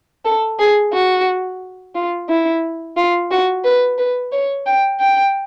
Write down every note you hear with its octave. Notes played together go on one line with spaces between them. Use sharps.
A4
G#4
F#4
F4
E4
F4
F#4
B4
B4
C#5
G5
G5